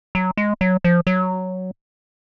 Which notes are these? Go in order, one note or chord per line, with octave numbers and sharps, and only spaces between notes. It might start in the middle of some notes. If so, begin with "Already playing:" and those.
F#3
G#3
F#3
F3
F#3